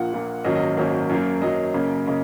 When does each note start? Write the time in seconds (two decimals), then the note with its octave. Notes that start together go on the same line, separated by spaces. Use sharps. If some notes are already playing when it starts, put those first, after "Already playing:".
Already playing: A#1 A#2 A#3 F#5
0.12 A#1 A#2 A#3
0.44 G#1 F#2 F#3 A#3 D#5
0.55 D#5
0.77 G#1 F#2 F#3 A#3
1.09 F#2 F#3 A#3
1.42 F#2 F#3 A#3 D#5
1.74 F#2 C#3 A#3
2.06 C#3 A#3 D#5